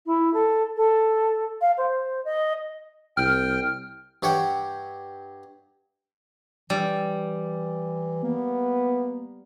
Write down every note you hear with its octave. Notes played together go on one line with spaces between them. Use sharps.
E4
A4
A4
F5
C5
D#5
C2 G5 F6
G2 G4 C#5 F#5 G5
E3 G3
A#3 B3